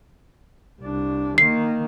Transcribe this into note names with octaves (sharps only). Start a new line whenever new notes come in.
C2 D4
D#3 A#3 C7